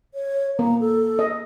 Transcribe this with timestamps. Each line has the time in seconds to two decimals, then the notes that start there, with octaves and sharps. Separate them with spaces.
0.14 C#5
0.59 A#3 A#5
0.80 A4
1.19 D#5